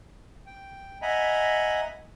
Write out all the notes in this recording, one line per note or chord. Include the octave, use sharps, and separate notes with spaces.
G5
D#5 E5 F#5 G#5 A#5 B5